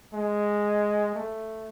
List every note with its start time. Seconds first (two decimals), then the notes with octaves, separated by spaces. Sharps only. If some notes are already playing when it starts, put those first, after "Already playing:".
0.14 G#3
1.15 A3